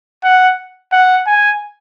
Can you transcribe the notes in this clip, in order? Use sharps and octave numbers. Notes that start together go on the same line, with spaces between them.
F#5
F#5
G#5